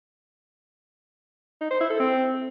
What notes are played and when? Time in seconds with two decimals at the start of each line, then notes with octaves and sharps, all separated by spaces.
1.61 D#4
1.71 C5
1.81 E4
1.90 A4
2.00 C4